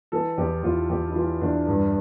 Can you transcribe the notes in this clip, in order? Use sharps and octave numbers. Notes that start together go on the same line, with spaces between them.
E3 A4
E2 G4
E2 F4
E2 G4
E4
E3 F4
E2 D4
G2